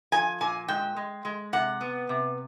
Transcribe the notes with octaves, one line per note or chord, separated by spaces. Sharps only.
F3 G#5
A#2 G#5
G#3 G5
G#3
G#3
C3 F#5
B3
C3